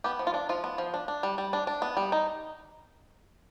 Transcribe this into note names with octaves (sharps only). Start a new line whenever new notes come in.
B3 G4
F3
F4
D4
F3 F4
B3
F3
D4
D4
G3
G3
D4
D4
B3
G3
D#4